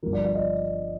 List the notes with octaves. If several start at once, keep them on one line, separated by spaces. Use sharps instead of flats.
G1 G2 D3 F3 A#4
D5
D5
D#5